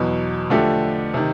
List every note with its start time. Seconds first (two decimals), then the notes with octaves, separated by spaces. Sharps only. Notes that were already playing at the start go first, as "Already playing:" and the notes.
Already playing: E2 B2 F#3
0.50 D3 F3 A3 D4 G4
1.14 C3 D#3